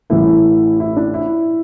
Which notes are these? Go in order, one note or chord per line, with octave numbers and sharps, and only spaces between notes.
A1 A2 E3 A3 E4
E4
D4
E4